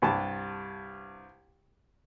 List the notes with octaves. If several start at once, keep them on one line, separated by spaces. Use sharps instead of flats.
C2 G2 A5